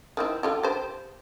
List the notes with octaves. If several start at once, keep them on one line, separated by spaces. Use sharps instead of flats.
D#3 E3 C4
D3 F4 G4
G4 C5